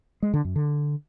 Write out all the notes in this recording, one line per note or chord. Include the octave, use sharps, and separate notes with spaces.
G#3
D3
F#2
D3